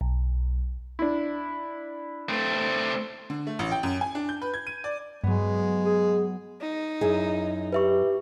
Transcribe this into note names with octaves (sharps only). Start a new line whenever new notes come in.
B1
D4 E4
A3 C4
D3
A3
A1
G5
F#2
G#5
D4
G6
B4
G#6
D#7
D5
G2 F#3 G#3 B3
G#4
D#4
F#2 E4 G#4
G4 B4 E5 C#6